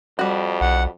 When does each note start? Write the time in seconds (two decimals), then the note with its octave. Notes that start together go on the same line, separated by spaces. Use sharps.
0.19 F2 G3 F#4
0.61 B1 F#5